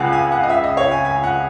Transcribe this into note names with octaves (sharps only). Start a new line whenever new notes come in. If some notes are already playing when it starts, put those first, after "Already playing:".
Already playing: C#2 C#3 F#5 G#5
G#5
F#5
D#5
E5
D#5
C#5
G#5
G#5
F#5